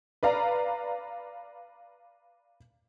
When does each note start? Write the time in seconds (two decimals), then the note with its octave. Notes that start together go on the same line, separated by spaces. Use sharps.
0.23 B4 D5 F5 A#5